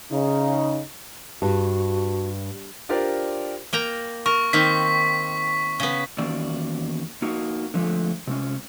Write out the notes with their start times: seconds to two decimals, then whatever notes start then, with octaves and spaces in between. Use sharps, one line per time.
0.11 C#3 D#4
1.42 G2 F#4
2.89 D4 F4 G4 A#4 C5 D5
3.73 A#3 G5 A#5
4.26 A#4 C#6
4.53 D#3 A#3 C4 B6
5.80 C#3 B3
6.18 E2 D#3 A#3 C#4 F#4 D5
7.22 A#3 D#4 F#4
7.74 D3 F3 G#3 A3
8.27 C3 G#3 C#4